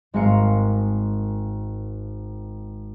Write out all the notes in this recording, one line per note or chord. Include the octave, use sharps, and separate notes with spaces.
G#1 G#3 A#4 F5 C#7